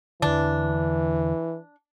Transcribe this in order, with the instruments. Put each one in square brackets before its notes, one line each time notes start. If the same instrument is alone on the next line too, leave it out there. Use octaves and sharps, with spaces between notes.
[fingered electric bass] E2 D3 [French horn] E3 [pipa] D4